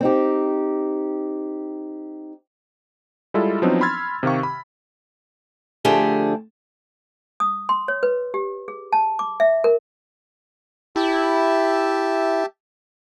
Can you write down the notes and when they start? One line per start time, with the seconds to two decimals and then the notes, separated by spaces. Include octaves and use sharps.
0.01 C4 D#4 G4
3.34 G3 G#3 E4 F4 A4
3.62 F3 F#3 B3 C4 D4 D#4
3.81 B5 C6 E6 F6 G#6 A6
4.23 C3 D#3 G4 F5 C#6
4.43 B5
5.85 D3 F3 A3 D4 G4 G#4
7.40 D#6
7.69 C6
7.88 C#5
8.03 B4
8.34 G4
8.68 G#4
8.93 A5
9.19 D6
9.40 E5
9.64 A#4
10.96 E4 G4 E5 A5